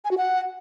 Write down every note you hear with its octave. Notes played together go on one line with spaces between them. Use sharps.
G#5
F#4
F#5